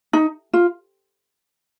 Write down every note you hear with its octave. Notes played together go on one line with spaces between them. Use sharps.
D#4
F4